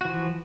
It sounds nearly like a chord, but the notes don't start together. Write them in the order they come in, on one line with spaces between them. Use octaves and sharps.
F#4 E3 F3